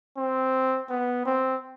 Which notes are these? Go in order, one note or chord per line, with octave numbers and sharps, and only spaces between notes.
C4
B3
C4